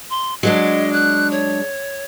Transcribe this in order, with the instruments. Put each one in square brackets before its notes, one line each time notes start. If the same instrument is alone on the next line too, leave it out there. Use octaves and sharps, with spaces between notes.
[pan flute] C6
[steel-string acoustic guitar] F#3 G#3 D4 [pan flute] D#5
[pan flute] F#6
C#5